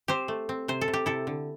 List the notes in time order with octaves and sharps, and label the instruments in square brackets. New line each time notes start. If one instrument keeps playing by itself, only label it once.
[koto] C4 G4 C5
A3
C4
C3 C5
A4
C3
G4
C3 E4 A4
D3